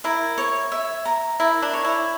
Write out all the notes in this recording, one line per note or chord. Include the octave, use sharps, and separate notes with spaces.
E4 A#4
C#5
E5
A#5
E4 A#4
D4
C#5
E4